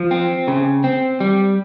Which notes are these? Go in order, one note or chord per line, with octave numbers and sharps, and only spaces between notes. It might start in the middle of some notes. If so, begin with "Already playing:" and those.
Already playing: F3
C4
C#3
C4
G3